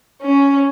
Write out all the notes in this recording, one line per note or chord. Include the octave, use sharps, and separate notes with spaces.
C#4